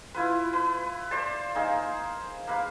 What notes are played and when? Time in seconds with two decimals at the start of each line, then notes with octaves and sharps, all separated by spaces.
0.14 E4 F4 B4
0.53 B4
1.11 C5 D5 A5
1.55 A#3 D#4 G#4
2.47 A#3 B4 F5